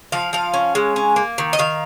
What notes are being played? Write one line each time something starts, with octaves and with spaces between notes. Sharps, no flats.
F3 F5
F3 F5
C#4
G#3
C#4
A#3
D#3
D#5
D#3 F5